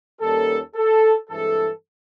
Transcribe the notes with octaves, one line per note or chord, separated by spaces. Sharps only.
D#2 D#3 G3 A#3 C#4 A4
A4
G2 E3 G#3 C4 A4